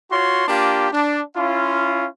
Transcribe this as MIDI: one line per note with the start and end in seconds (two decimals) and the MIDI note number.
0.12 0.45 65
0.12 0.45 66
0.12 0.45 73
0.12 0.45 84
0.48 0.87 58
0.48 0.87 62
0.48 0.87 65
0.48 0.87 67
0.92 1.21 62
1.35 2.06 61
1.35 2.06 64
1.35 2.06 65